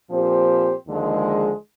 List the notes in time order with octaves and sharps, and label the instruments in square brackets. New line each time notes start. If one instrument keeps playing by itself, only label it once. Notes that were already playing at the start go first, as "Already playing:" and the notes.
[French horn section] A#2 F3 C4 G4 C5
D#2 D3 F3 G#3